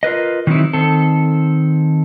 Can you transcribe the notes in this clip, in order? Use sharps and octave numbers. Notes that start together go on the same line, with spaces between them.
F4 A#4 B4 D#5
D#3 E3 F#3 C4 D#4 E4
D#3 C4 A4